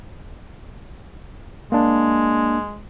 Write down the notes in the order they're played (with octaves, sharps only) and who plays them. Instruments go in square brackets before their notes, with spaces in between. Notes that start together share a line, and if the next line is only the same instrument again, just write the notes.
[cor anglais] G#3 [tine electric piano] A#3 D4